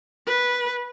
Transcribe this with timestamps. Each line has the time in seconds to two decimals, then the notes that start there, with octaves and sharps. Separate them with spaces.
0.26 B4